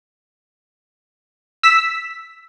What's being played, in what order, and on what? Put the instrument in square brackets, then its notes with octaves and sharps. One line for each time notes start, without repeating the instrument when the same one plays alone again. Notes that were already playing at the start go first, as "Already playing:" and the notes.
[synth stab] E6 B6